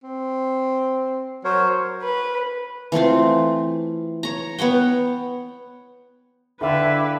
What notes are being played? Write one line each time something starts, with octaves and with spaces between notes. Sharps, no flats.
C4
F#3 A#4 C5 C#5
B4
E3 A3 C4 F4
C#5 A#5
B3 C#5 F#5 G5
D3 D4 E4 B4 E5 F5 G5